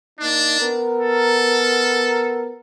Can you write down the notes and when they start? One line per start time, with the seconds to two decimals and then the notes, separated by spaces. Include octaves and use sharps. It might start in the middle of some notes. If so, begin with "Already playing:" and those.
0.20 A#3 D4 D#4
0.60 B3 A#4
1.00 A4